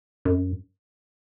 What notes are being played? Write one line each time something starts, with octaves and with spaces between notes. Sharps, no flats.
F#2